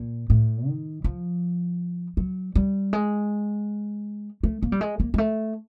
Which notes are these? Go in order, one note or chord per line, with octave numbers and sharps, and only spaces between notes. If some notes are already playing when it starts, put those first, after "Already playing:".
Already playing: A#2
A2
D#3
F3
F#3
G3
G#3
A3
A#3
G3
G#3
A#3
G#3
A3